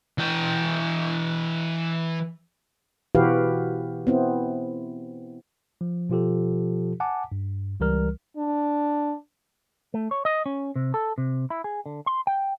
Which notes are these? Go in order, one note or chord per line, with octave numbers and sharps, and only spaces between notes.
E3 G5
B2 E3 F#4 G4 B4 F5
B3 C4 E4
F3
B2 F3 F4 G4 A4
F#5 G#5 A5 D6
G2
C#2 E3 G3 A#4 F6
D4
A3
C#5
D#5
C#4
C3
A4
C3
E4
G#4
D3
C6
G5